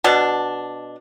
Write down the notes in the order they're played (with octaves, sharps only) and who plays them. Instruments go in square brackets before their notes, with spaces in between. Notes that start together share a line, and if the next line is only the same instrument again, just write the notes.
[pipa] B2 D4